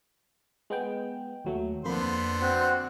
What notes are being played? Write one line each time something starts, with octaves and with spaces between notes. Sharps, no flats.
G#3 B3 G5
D#2 F#3 A3
F2 D3 A#3 B3 C5 B5
C4 F#4